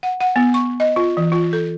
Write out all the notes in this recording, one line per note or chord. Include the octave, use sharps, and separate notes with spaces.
F#5
F#5
B3
C#6
D#5
F4
E3
F4
A4